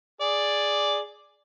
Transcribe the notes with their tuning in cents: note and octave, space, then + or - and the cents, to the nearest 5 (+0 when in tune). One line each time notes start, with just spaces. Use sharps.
G#4 +0 D5 +0